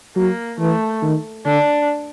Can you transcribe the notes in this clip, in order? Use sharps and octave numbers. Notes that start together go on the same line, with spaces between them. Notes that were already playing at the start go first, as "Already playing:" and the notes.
F#3 A#3
E3 A3
D#3
D3 D4